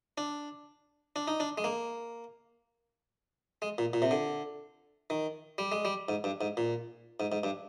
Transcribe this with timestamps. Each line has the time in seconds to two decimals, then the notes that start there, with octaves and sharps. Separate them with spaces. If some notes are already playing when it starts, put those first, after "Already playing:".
0.18 D4
1.16 D4
1.28 D#4
1.40 D4
1.58 G#3
1.64 A#3
3.62 G#3
3.78 A#2
3.93 A#2
4.02 C3
4.11 D3
5.10 D#3
5.58 G3
5.72 G#3
5.85 G3
6.09 G#2
6.24 G2
6.41 G#2
6.57 A#2
7.20 G#2
7.32 G#2
7.44 G2